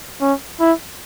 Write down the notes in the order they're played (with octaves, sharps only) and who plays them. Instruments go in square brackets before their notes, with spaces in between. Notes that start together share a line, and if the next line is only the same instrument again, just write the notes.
[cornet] C#4
E4